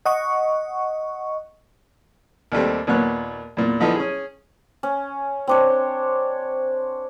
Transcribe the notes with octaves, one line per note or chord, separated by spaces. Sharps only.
D#5 F#5 C#6
D#2 G3 A3 C4
D#2 A#2 B3 C#5 F#6
E2 A#2
D3 F3 B3 D#4 E4
C#4 G#4
C#4
C4 D4 C#5